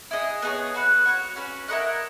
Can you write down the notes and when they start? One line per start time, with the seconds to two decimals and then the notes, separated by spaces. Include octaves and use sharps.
0.11 E4 G#4 D#5 F#5
0.42 B3 D#4 G#4 C#5
0.74 F#4 B4 F#5
1.05 F#4 C#5 F#5
1.36 C#4 F#4 B4
1.68 E4 A#4 D#5 F#5